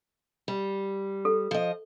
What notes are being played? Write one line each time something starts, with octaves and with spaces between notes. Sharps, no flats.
G3
A4
F3 D#5